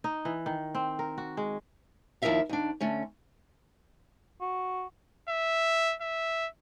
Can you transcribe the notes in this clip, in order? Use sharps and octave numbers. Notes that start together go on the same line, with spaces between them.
D#4
E3
D#3
C4
A#4
F#4
G#3
D#2 F3 E4 A#4 E5 F5
D#2 D4
D3 A3 C#4
F#4
E5
E5